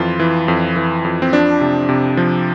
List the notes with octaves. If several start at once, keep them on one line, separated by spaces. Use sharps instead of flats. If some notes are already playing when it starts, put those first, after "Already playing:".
Already playing: F2 E3 F4
E3
F2
E3
F2
C4
F3 D4
C3
C3
F3